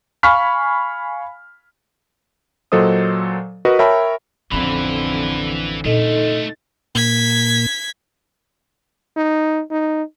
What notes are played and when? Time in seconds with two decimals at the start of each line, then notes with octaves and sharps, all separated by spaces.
0.23 F5 G#5 B5 C#6 F6 B6
2.72 A#2 F#3 A4 C5 D#5 D#6
3.65 F#4 A#4 B4 D#5
3.79 A#4 C#5 E5 G5 A5 B5
4.51 A1 F2 D3 E3 C#4 B5
5.85 A#2 A3 D#4 F4 A4 D#5
6.95 A#2 A#3 G#6 B6
9.16 D#4
9.71 D#4